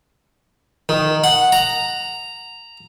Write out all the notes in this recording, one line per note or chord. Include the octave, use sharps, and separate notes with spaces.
D#3
F#5
A#5